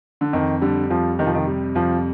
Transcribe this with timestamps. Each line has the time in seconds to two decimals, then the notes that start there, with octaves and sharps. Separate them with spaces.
0.21 D3
0.33 F2 D#3
0.62 D3 G3
0.90 F2 F3
1.19 C3 D#3
1.27 F3
1.35 D#3
1.47 G3
1.75 F2 F3